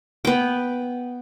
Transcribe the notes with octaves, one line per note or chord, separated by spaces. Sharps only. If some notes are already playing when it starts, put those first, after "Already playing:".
B3 G5